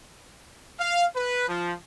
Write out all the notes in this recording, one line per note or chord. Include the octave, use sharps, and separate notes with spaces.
F5
B4
F3